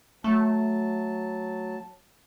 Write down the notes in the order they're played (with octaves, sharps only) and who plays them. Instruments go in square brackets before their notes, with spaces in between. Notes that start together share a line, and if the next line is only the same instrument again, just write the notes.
[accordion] F#3 A5 [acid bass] A3